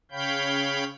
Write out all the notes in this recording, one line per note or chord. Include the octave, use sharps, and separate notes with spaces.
C#3 C#5 F5 G5 B5 G6